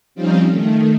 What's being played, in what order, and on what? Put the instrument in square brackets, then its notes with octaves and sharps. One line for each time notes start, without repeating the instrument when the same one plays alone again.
[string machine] F3 G3 C4 C#4 D#4 F4
D#3 A3